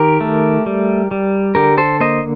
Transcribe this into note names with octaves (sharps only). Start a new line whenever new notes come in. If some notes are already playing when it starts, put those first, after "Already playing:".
Already playing: D#3 G4 A#4
A3
G3
G3
D3 G4 A#4
A4 C5
A#3 C5 D#5